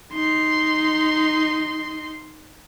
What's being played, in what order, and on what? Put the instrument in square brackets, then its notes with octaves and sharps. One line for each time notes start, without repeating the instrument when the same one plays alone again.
[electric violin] D#4 C6